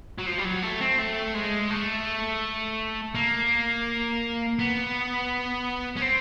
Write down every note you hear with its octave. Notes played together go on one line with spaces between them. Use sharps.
F#3
F3
G3
F#3
A3
C4
A3
G#3
A3
A#3
B3
C#4
C4